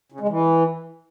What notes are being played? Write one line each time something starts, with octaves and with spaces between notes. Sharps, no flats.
C#3
G#3
E3